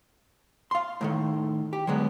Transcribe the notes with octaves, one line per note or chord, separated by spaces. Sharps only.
F5 C6
A2 D#3 A3
G4
D3 F#3 G#3 B3